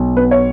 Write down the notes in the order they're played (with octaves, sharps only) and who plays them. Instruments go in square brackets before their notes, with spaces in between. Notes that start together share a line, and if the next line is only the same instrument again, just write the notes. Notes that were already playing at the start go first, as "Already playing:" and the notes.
Already playing: [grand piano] B1
[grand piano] B3 [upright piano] B4
[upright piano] C#5